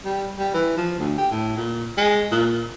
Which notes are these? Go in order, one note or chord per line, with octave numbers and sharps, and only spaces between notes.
G3
G3
E3
F3
D2
G4
A2
A#2
G#3
A#2